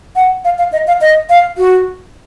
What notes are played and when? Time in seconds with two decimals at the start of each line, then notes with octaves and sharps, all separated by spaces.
0.16 F#5
0.45 F5
0.58 F5
0.72 D#5
0.87 F5
1.01 D#5
1.29 F5
1.58 F#4